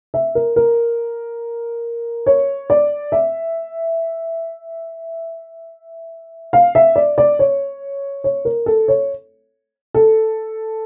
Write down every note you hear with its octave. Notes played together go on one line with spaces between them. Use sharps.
E5
A#4
A#4
C#5
D5
E5
F5
E5
D5
D5
C#5
C#5
A#4
A4
C#5
A4